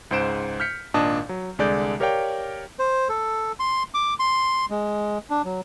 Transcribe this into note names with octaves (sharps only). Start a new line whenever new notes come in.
C#2 G#2 C5 D7 E7
F6 G6 B6 C#7
G#1 A#2 D4 D#5 A5 D#6
F#3
C2 D3 G#3 D5 D6 G6
G4 A#4 C#5 D5 F5 G5
C5
A4
C6
D6
C6
G#3
D4
F#3